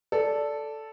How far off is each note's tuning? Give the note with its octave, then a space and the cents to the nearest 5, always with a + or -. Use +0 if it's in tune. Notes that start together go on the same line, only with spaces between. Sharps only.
A4 +0 D5 -10